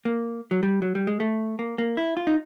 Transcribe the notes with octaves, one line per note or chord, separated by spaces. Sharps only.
A#3
F#3
G3
F#3
G3
G#3
A3
A#3
A#3
E4
F4
D#4